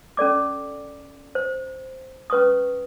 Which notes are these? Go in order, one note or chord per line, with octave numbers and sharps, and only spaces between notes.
C#4 A4 D5 D6
C5
C#4 B4 C#6 D#6